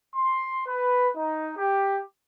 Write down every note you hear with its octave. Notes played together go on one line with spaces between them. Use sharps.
C6
B4
D#4
G4